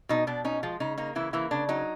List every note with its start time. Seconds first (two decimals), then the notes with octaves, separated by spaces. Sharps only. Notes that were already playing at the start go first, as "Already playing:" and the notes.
0.09 B2 D#4
0.27 B2 D4
0.45 C#4 D#4
0.63 F3 G#3 F4
0.80 C#3 D#4
0.98 A#3 D#4
1.15 C#3 E3 E4
1.33 E3 A#3 E4
1.51 C#3 D4
1.69 F#3 D#4